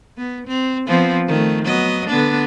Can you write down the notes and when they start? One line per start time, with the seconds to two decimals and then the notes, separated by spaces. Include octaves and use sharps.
0.18 B3
0.47 C4
0.86 F3 B3 C4
1.28 D#3 A3
1.65 F#3 B3 D#5
2.08 D3 B3 D4